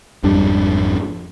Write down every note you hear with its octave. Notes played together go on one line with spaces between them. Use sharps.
G#1 F2 G3 D4